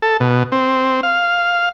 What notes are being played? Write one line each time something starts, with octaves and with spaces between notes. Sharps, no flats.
A4
B2
C4
F5